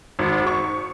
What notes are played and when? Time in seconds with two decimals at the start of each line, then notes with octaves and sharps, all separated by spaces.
0.19 G#1
0.47 C#6